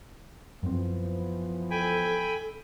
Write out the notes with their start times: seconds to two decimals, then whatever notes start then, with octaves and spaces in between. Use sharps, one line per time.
0.63 F#2 E3 F3 B3 C4
1.71 A4 G5 G#5 B5